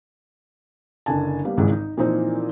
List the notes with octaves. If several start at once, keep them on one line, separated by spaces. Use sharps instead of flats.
F#1 D3 G#5 A5
G3 A#3 B3
G#1 C#2 G#2 D#3 E3 G#3
D#4
A#2 E3 F3 C4 D#4